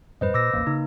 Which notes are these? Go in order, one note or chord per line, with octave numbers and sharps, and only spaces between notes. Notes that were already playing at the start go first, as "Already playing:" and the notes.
F2 G#2 G3 B4 C5 D#5
A#2 D6 E6 A#6
A1 D#2 A#3 B4
C#3 D#4